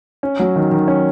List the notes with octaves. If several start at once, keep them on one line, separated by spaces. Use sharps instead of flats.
C#4
F#3
D#3
D#3
C#4